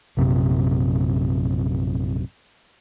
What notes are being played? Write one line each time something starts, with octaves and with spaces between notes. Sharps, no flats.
A#1 F#2 C3